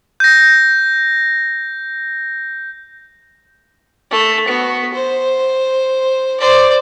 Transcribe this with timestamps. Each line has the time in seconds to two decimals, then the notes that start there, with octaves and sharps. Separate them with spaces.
0.20 G6 A#6
4.11 A3
4.48 B3 F#4
4.94 C5
6.40 C5 D5